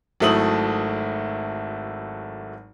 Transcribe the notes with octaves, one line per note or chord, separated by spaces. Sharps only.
G#1 F#3 A3 E4 D#6 F#7